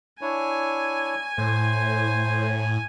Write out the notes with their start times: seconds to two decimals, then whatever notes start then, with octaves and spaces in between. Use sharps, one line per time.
0.21 D4 E4 C#5 G#5
1.38 A2 C5